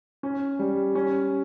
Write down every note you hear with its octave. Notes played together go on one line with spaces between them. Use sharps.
C#4
G3
C#4